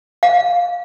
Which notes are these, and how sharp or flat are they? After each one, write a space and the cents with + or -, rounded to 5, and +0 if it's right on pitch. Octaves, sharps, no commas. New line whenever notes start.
F5 +15